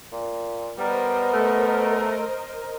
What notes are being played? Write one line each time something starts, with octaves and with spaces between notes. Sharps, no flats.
A#2
G3 B3 A#4 C5 D#5
A3